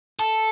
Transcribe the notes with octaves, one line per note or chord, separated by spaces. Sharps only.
A4